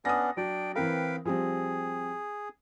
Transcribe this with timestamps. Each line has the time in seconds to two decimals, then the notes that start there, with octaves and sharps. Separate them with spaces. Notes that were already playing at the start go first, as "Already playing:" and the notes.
0.05 B3 C#4 D4 D#6 A#6
0.37 F#3 D4 G5
0.75 E3 C4 A#4 B4 F5 G5
1.25 F3 G3 C4 G#4